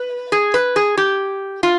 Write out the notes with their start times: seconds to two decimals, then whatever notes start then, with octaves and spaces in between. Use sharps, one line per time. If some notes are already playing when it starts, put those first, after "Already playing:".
Already playing: B4
0.32 G#4
0.54 B4
0.76 G#4
0.97 G4
1.63 F4